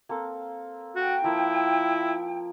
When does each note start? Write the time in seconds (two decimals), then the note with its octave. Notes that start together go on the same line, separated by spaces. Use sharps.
0.09 A#3 C4 A4
0.96 F#4 G5
1.24 F3 A#3 E4 A#5